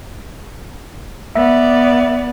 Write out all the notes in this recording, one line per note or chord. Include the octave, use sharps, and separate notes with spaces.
B3 D5 E5